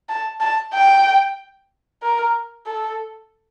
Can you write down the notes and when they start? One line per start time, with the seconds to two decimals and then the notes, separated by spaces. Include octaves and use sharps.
0.09 A5
0.40 A5
0.73 G5
2.02 A#4
2.66 A4